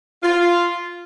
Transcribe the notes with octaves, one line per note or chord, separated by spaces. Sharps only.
F4